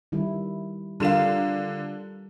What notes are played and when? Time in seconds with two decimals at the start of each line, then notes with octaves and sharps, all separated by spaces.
0.12 D#3 G3 E4
1.00 D3 G3 F4 A4 A#4 F5 E7